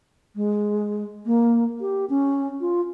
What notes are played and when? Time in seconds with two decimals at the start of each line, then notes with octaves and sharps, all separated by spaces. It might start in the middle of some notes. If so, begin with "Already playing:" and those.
0.36 G#3
1.26 A#3
1.81 G4
2.10 C#4
2.61 F4